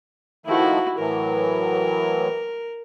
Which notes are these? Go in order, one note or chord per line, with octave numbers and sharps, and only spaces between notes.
D#3 F3 A3 E4 F#4
A2 E3 F#3 A#4